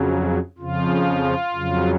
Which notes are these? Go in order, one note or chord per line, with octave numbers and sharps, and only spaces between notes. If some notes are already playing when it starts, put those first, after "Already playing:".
Already playing: F2 C#3 F#3
F2 C#3 F3 F4
F2 C#3 F#3